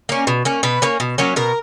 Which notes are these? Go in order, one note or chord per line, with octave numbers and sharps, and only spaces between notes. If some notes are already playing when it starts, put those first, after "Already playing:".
A#3 C#4
B2
A#3 C#4
B2 B4
A#3 C#4
B2
F#3 A#3 C#4
B2 A#4